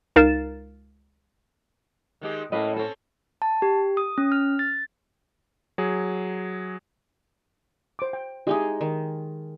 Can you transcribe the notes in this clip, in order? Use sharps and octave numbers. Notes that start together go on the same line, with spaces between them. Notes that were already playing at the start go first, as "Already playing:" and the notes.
C#2 D#4 A#4 F5 A6 E7
D#3 G#3 G4
A2 A#3 C#4 B4 D#5
C4 C#4 A4
A5
G4
D#6
C#4
F6
A6
F#3 G#4
C5 D6
G5
G#3 D#4 E4 G4 G#4
D#3